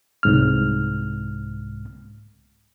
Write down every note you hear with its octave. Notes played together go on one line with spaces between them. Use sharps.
C2 G#2 F6